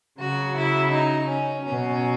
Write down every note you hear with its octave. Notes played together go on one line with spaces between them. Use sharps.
C#3 F#3 F#4
E4
D#4
C#4
B2 F#3 C#4